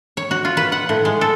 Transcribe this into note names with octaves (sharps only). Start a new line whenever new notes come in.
C#5
F#4
F4
B4
F#5
A2
G#3
A4